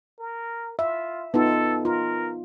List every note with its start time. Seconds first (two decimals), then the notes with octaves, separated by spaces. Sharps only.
0.20 A#4
0.79 F4 E5
1.34 B3 D#4 F4 A4
1.85 F4 A#4